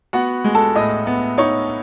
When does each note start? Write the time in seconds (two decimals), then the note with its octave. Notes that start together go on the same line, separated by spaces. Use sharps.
0.13 B3 F#4 F#5
0.44 G#3
0.55 A4 A5
0.75 A2 D#5 D#6
1.07 B3
1.38 D#4 C#5 C#6